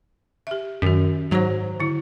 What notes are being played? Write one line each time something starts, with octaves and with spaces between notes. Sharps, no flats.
G4 E5
F#2 D#3 F#4
G#2 F#3 F#4 C5
D3 E4